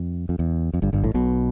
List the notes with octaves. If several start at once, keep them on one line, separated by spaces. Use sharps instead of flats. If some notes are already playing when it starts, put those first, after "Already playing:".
Already playing: F2
F2
E2
F2
G1 G2
G1 G2
A1 A2
B1 B2